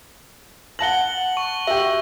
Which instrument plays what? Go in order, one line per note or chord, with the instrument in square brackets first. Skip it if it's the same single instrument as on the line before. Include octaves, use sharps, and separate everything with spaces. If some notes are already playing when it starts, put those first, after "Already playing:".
[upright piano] F#5 A5 A#6 [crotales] F#7 G7
[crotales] C#6
[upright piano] F#4 G4 [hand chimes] E5